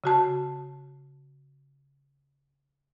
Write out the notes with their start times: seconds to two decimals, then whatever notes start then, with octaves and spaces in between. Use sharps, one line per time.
0.04 C#3 F#4 A5